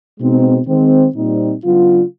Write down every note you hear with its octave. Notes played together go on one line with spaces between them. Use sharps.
B2 G#3 C4 D#4
D#3 G#3 C4
A#2 G3 C4 D#4
C#3 F#3 B3 D4 F4